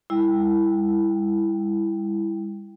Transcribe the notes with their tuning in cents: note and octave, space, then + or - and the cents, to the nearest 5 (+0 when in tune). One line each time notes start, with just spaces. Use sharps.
G3 +40 E4 +0 G5 +0